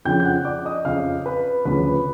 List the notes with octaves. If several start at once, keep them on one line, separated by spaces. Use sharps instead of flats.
F2 C#3 F3 G5 G6
G6
F#5 F#6
D5 D6
D#5 D#6
F2 C#3 F3 F5 F6
B4 B5
D2 C#3 F3 B4 B5